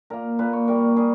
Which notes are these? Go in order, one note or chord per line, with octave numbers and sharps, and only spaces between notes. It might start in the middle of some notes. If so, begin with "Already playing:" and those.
A#2 A#3 A#4
A#2 A#3 B4
C#5
A#2 G3 A#3 A#4
A#2 G3 G#4